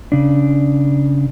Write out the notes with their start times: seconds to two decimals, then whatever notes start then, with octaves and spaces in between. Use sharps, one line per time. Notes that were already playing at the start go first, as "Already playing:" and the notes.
0.12 C#3 D4